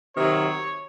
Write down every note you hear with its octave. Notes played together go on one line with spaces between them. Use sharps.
C3 D#3 F#3 C#5